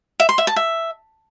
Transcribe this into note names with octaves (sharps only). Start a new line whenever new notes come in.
E5
C6
E5
A5
E5